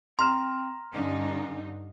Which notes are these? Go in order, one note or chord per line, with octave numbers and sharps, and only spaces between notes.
C4 A#5 C6 F6 E7
G2 D3 C#4 D#4